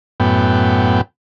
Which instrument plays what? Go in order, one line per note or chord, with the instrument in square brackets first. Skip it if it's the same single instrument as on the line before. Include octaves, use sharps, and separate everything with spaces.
[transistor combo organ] F#2 A2 B3 G5